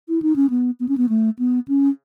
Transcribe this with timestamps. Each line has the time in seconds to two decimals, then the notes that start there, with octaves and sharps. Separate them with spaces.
0.09 E4
0.22 D#4
0.36 C#4
0.50 B3
0.80 B3
0.88 C#4
0.97 B3
1.09 A3
1.39 B3
1.68 C#4